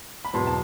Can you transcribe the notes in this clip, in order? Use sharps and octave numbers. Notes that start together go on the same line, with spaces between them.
B5
E2 B2 F#3 B3 A5 C6
A5